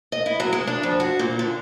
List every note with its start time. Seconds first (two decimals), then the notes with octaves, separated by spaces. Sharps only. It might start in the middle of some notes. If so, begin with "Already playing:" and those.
0.12 D#5
0.26 E4
0.40 F#3
0.53 G#3
0.67 D4
0.83 F2
1.00 F#4
1.19 A#2
1.39 D3